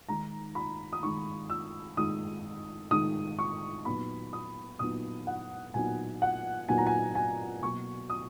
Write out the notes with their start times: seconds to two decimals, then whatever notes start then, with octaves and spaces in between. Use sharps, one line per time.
0.08 D#3 G#3 D#4 A#5
0.55 B5
0.93 D#6
1.03 D#3 G#3 D#4 C#6
1.50 E6
1.97 D#3 G#3 D#4 D#6
2.91 D#3 G#3 D#4 D#6
3.39 C#6
3.85 A#2 F#3 B3 D#4 B5
4.33 D#6
4.79 A#2 F#3 B3 D#4 D#6
5.27 F#5
5.74 A#2 F#3 B3 D#4 G#5
6.22 F#5
6.69 A#2 F#3 B3 D#4 G#5
6.78 A#5
6.87 G#5
7.15 G#5
7.63 B2 F#3 A#3 C#6
8.10 D#6